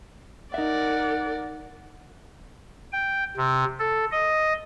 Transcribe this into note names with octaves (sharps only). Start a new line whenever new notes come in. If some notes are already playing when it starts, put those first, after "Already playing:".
D#4 A#4 D5 E5 F#5
G5
C3
A4
D#5